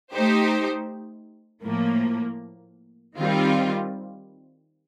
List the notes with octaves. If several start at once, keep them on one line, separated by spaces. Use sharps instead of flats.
A3 D#4 G4 C5
A2 F3 A#3
D#3 G3 C4 F4